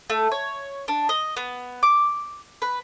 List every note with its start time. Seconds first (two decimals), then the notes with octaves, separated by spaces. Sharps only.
0.10 A3
0.32 C#5
0.88 D4
1.09 D#5
1.37 B3
1.83 D6
2.62 B4